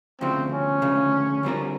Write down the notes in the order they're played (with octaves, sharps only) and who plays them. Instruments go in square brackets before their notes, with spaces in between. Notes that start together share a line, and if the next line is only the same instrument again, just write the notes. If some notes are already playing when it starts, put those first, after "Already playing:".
[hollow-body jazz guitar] D2 C#3 F3 [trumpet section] C4
[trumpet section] C#4
[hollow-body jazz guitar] D2 C#3 F3
D3 G3 C4 F4 A#4